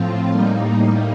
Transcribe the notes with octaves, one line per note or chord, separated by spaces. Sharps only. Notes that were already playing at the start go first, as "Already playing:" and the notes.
Already playing: A2 F3 C4 F4
A2 G3 A#3 D#4